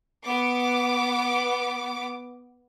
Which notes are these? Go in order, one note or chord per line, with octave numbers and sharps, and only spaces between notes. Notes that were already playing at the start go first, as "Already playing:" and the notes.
B3 D6